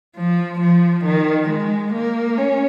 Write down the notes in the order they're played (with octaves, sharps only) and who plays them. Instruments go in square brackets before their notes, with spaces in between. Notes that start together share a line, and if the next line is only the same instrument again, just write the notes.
[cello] F3
F3
D#3
G#3
A#3
C#4